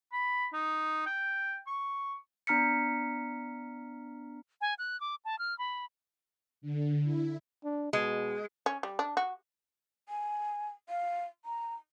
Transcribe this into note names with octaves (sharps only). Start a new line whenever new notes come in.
B5
D#4
G5
C#6
B3 D4 A#5 F6 B6 C#7
G#5
F#6
D6
A5
F6
B5
D3
E4
D4
B2 G#3
C#4
G3
D4
F#4
G#5
F5
A#5